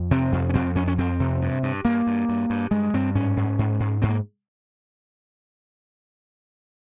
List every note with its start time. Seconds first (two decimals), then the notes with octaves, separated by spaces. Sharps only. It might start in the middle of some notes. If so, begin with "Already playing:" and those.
Already playing: F2
0.11 C3 C4
0.32 F2
0.50 C#4
0.54 F2 C4
0.75 F2 C#4
0.88 C#4
0.98 F2 C4
1.20 C3
1.42 G2
1.63 G2
1.85 G2 A#3
2.07 G2
2.29 G2
2.50 G2
2.71 G2 G#3
2.94 G2 C4
3.15 G#2 C#4
3.37 G#2
3.59 G#2
3.80 G#2
4.02 G#2 C4
4.09 A#3